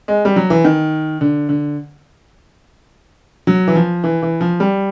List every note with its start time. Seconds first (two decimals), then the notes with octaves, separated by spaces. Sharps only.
0.08 G#3
0.25 G3
0.36 F#3
0.50 E3
0.64 D#3
1.21 D3
1.49 D3
3.47 F#3
3.67 E3
3.76 F3
4.04 E3
4.22 E3
4.41 F3
4.60 G3